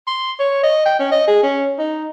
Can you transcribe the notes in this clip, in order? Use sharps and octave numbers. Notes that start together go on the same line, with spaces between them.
C6
C#5
D#5
G5
C#4
D#5
G#4
C#4
D#4